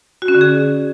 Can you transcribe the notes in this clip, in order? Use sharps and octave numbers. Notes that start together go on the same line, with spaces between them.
F#4
C#4
D3
G#4